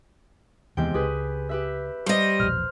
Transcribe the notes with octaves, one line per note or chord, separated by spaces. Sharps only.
D#2 G#2 C3 E3 B3 G5
C#2 G4 G#4 B4
G4 B4 E5
G3 C5 D#5
E1 A#1 F6